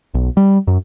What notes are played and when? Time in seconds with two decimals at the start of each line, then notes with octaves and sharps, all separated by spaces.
0.14 B1
0.37 G3
0.67 F#2